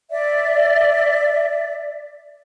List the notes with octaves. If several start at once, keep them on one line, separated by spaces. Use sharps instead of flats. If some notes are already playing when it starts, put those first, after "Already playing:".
D5 E5